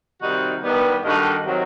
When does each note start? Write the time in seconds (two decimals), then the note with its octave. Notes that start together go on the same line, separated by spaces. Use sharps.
0.21 C3 D#3 G3 D#4 F#4
0.63 G2 D#3 G3 B3
1.04 G2 D#3 A3 D#4 F#4
1.45 C3 D#3 F#3